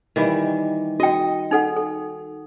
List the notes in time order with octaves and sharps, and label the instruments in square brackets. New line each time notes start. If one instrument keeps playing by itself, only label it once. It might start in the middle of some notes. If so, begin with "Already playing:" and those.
[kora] D#3 E3 G3
[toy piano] F#4 G5 [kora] D#5
[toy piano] D#4 A4 F#5
A4